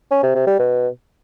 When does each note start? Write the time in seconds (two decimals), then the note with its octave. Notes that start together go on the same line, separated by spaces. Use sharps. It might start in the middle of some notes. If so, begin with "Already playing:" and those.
0.11 C#4
0.23 C3
0.35 C3
0.47 G3
0.59 B2